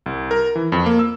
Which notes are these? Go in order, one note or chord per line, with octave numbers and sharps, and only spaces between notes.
C2
A#4
E3
F2
A#3
E6